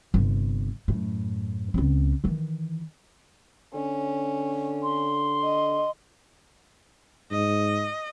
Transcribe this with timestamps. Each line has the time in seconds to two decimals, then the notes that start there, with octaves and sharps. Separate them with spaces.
0.14 G1 C3
0.88 F#2 A2
1.74 C#2 C4
2.24 D#3 E3
3.75 D3 C#4
4.83 C6
5.44 D#5
7.31 G#2 D#5